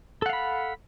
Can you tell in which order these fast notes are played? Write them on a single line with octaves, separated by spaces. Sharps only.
A4 F#5 F5 B5